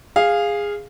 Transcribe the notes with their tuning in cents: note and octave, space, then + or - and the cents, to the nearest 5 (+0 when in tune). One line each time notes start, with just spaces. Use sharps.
G#4 -15 F5 +0